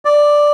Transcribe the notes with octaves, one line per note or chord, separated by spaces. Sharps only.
D5